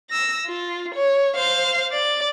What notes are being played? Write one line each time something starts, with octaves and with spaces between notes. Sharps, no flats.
E6 A#6
F4
C#5
C5 F5
D5 A6